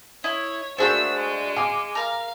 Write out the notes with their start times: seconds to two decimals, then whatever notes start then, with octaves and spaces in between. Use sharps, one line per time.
0.24 E4 C#5 D#5
0.78 A3 A#3 D4 F#4 G#4 C5 E6 G6
1.14 G#3
1.56 F5 G#5 D6 D7
1.95 A#4 F5 A#5